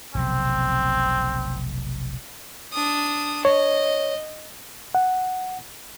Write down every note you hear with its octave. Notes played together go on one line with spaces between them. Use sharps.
F1 B1 C3 C4
D4 D#6
C#5 D#5
F#5